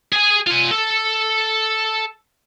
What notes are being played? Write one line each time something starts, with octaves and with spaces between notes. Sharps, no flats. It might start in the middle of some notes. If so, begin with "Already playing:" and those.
G#4 G#5
F4 G#5
A4